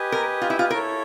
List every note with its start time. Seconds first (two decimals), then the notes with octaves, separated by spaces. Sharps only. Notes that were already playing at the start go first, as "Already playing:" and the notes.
Already playing: G4 B4 D#5 G#5
0.12 A#4
0.42 F4
0.50 E4
0.59 F4
0.70 E4 A#4
0.73 A4 C#5